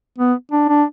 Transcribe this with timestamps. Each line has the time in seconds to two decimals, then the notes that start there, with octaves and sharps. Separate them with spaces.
0.18 B3
0.51 D4
0.69 D4